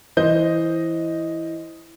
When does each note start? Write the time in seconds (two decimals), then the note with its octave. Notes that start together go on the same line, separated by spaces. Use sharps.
0.17 E3 C5 D#5 G6